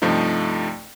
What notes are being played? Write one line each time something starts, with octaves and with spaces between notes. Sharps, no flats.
G2 C3 F3 A3 D#4